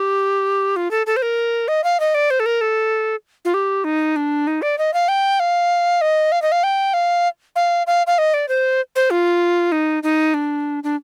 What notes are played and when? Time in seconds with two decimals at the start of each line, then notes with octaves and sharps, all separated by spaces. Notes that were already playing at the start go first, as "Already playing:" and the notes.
Already playing: G4
0.76 F4
0.91 A4
1.07 A4
1.17 C5
1.22 A#4
1.68 D#5
1.84 F5
2.00 D#5
2.14 D5
2.30 C5
2.40 A4
2.46 A#4
2.61 A4
3.45 F4
3.54 G4
3.84 D#4
4.16 D4
4.47 D#4
4.62 D5
4.78 D#5
4.94 F5
5.08 G5
5.40 F5
6.01 D#5
6.32 F5
6.42 D#5
6.52 F5
6.63 G5
6.94 F5
7.56 F5
7.87 F5
8.07 F5
8.18 D#5
8.34 D5
8.48 C5
8.96 C5
9.10 F4
9.72 D#4
10.03 D#4
10.34 D4
10.84 D4